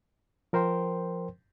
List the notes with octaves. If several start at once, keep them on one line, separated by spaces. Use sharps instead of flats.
F3 A#4 C5 G5 C6